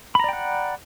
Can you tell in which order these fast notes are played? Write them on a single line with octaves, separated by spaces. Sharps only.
B5 A#5 D5 G5 F#5